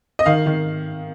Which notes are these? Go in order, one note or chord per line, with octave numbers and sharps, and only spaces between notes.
D#5
D#3 F5
D#3